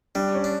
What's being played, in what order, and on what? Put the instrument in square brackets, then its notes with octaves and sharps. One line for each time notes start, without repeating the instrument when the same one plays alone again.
[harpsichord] G3 [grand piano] D4
[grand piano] C#4
[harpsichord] D4